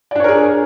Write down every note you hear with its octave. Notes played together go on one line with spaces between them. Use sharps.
D4 G#4 A#4 C#5 D5